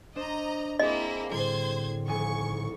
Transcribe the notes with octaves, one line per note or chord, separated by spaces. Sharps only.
D4 C5 D#5 A#5 E7
A#3 C4 E4 G#4 D#5
A2 D3 G3 C5 C6 G#6
D#1 A#1 G#5 C#6